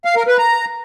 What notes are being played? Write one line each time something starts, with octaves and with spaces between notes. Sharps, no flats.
F5
A#4
B4
A#5